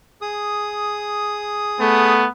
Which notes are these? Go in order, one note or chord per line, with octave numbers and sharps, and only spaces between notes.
G#4 D#6
A3 B3